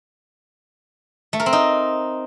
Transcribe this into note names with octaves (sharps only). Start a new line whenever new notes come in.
A3
A#4
C4
D#4